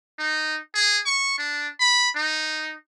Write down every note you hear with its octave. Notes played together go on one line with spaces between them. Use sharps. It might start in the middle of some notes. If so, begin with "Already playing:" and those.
D#4
G#4
C#6
D4
B5
D#4